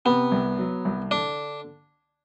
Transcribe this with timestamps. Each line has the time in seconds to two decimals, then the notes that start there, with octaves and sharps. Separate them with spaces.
0.05 C3 B3
0.32 C2
0.58 F#3
0.85 C2
1.11 D3 D4